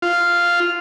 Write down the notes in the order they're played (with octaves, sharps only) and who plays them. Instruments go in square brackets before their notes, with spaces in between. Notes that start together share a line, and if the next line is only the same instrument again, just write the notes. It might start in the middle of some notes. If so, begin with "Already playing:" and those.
[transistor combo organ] F4